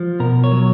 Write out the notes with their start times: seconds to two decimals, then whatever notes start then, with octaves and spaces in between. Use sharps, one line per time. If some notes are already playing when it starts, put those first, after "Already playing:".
Already playing: F3
0.20 B2 A#4
0.44 C#5
0.52 F#3